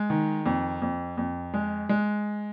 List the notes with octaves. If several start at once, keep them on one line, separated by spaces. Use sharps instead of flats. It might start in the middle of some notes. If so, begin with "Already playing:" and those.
Already playing: G#3
D#3
F2
F2
F2
G#3
G#3